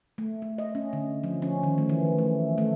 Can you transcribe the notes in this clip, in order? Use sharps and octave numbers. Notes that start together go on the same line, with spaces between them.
A3
A3
D#5
C#4
D3
F3
C#4
D#3
A3
E3
A3
A3